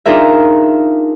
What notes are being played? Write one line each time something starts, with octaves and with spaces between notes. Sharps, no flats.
D4 D#4 F4 G#4 A#4 E5